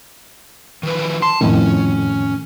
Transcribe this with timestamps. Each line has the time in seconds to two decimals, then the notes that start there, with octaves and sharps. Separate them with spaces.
0.83 D#3 F3 B4
1.22 A5 C6
1.41 F2 A2 D#3 C#4